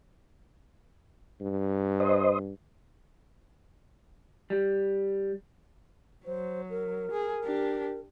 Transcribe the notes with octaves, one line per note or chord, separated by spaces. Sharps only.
G2
C5 D#5
G3
F#3 C5
A#4
G#4
D4 G4